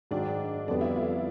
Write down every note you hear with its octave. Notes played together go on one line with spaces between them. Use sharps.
G#2 D#3 F#3 D4
F2 D3 G3 B3 D4
E4
F4